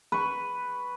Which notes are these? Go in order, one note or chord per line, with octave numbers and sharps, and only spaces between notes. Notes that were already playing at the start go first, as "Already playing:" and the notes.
B4 C#6